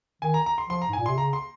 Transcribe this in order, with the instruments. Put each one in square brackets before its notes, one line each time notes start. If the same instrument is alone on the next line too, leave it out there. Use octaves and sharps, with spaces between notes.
[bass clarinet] D#3 [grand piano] G#5
[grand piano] A#5
A#5
C6
[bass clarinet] F3 [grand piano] C6
[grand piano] A#5
[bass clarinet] G#2 [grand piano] G#5
[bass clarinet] A#2
[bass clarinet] C3 [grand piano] C6
[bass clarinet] C#3 [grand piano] A#5
[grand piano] C6